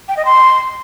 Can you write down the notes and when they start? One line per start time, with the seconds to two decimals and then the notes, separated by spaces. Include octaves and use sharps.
0.08 G5
0.17 D#5
0.25 C6